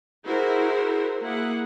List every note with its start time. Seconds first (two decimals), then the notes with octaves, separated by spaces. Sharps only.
0.24 E4 F#4 G#4 A#4 C5
1.21 A#3 E4 G#4 F#5